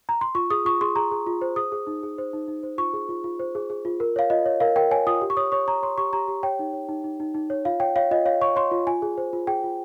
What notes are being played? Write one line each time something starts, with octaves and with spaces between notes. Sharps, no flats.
A#5
C6
F4 C#6
G#4 D#6
F4 C#6
G#4 C6
G#4 A#5
G#4
F4
C5
G#4 D#6
G#4
D#4
G#4
C5
D#4
D#4
C5
F4 C#6
G#4
F4
F4
C5
G#4
G#4
F4
A#4
C#5 F5
F4 D#5
C#5
A#4 F5
A#4 G5
C#5 G#5
F4 D#6
G4
C#6
C#5 D#6
C#5 C#6
C#5 A#5
C#5 C6
G4 C#6
G4 A#5
G4
C#5 G5
D#4
C#5
D#4
D#4
D#4
D#4
C#5
F4 F5
C#5 G5
C#5 F5
F4 D#5
C#5 F5
C#5 C#6
C#5 C6
F4
F4 G#5
G#4
C5
F4
G#4 G5
F4